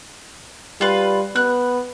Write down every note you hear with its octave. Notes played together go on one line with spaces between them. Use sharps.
G3 F4 B4
B3 F#6